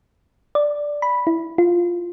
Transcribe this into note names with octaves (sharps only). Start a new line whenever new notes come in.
D5
B5
E4
F4